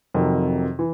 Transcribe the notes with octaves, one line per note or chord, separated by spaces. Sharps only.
F2 C3 D#3 F#3
E3